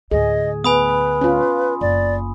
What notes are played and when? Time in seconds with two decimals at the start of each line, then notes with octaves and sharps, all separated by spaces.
0.11 D2 A2 G#4 D#5
0.64 B3 B4 G#5 B5 D#6
1.21 C#4 F4
1.81 F#1 D5